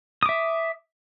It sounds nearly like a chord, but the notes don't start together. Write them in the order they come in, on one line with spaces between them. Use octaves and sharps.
D#6 D6 E5